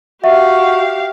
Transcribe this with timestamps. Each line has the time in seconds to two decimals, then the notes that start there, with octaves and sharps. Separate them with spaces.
0.24 F#4 G4 E5 F5